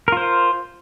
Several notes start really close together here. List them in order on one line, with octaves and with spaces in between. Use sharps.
A#4 F4 C5